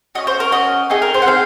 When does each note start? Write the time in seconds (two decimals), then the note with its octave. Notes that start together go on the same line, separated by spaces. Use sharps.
0.15 C#4 F#4 D#5
0.27 C5
0.40 A#4
0.52 C#4 F#4 D#5
0.90 C4 D#4 G#4 D#5
1.02 A#4
1.14 C5
1.22 F#5
1.26 C4 D#4 G#4 F5